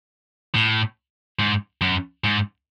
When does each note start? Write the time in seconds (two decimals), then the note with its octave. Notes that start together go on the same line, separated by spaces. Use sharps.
0.55 A2
1.39 G#2
1.81 F#2
2.24 G#2